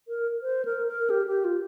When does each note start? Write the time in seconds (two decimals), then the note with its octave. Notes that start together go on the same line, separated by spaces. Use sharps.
0.08 A#4
0.42 C5
0.65 A#4
0.87 A#4
1.10 G4
1.27 G4
1.44 F4